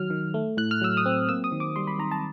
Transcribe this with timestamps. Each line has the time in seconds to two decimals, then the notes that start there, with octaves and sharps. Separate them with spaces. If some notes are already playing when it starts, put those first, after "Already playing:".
Already playing: D#3 F#3 F6
0.10 D#3
0.34 A3
0.57 A2 F#6
0.71 F6
0.81 F#3 E6
0.97 D#6
1.05 C4
1.29 A#3 E6
1.44 D#6
1.52 D#3
1.60 D6
1.76 G3 C6
1.87 B5
1.99 D#3 A#5
2.11 A5